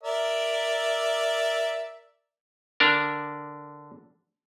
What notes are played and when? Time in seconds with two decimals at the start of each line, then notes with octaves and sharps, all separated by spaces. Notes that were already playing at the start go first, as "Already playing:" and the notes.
0.03 A#4 D5 E5
2.80 D3 D4 A#4